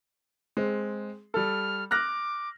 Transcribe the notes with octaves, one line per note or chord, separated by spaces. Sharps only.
G#3 C4
G3 A4 F6
D6 F6 F#6 A#6